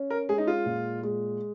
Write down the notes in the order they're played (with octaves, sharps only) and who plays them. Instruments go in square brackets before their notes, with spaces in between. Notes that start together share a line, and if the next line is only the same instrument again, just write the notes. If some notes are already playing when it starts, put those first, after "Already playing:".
Already playing: [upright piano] C#4
[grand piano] A#4
[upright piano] G#3 [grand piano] G#4
[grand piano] D#4
F4
[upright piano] A#2
G#3